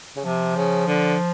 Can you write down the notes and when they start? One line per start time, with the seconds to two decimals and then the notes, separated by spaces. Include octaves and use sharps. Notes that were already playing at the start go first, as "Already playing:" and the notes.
0.16 C#3
0.24 C3 F3
0.56 C#3
0.87 D3